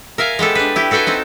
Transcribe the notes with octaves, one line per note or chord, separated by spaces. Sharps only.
A#4 E5 F5 G#5 A#5
G#3 B3 G4 A4
D4 B4
E4 G4
F#4 A4 B4 G5 G#5
C4 D#4 A4